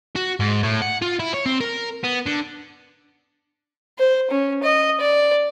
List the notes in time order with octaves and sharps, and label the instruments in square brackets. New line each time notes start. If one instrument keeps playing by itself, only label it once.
[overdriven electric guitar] F#4
G#2
A2
F#5
F4
E4
C#5
C4
A#4
B3
D3
[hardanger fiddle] C5
C#4
D#5
D5